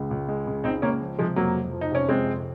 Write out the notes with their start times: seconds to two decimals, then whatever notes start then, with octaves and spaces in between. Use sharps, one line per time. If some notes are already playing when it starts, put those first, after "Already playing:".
Already playing: C#2 C#3 G#3
0.11 C#2
0.29 G#3
0.47 C#3
0.64 C#2 C4 D#4
0.82 C#2 A#3 C#4
1.01 F3
1.19 C3 F3 G#3
1.36 F2 F#3 A#3
1.55 F2
1.73 F3
1.81 D#4
1.91 C3 C#4
2.09 F2 G#3 C4
2.27 F2